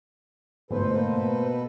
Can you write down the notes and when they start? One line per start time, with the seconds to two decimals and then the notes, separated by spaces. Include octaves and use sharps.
0.71 G1 G#2 B2 A3 A4 B4 C5
0.95 A#3 C5